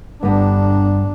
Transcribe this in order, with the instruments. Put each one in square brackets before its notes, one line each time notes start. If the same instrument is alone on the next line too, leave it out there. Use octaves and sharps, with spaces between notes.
[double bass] G1 D4 [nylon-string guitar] G2 B3